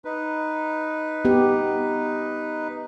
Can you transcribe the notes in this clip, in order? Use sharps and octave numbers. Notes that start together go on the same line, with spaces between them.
D#4 B4
B3 G4